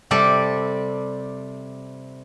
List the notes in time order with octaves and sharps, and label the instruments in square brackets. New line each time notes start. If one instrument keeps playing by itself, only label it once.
[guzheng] C3 G3 A4 D5